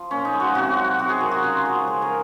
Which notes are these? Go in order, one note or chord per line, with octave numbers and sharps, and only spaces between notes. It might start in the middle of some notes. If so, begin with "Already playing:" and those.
Already playing: F3
A#2 C#4
D#4
F3 G#3
F#4
C3 F#4
F#3
C3 F#4
G#4
F#3 A#4
F#4
C#3 F4
F3 G#3 F#4
C#3 G#4
A#4